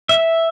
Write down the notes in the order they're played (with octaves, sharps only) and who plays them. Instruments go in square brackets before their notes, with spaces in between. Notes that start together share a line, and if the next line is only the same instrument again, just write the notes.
[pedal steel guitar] E5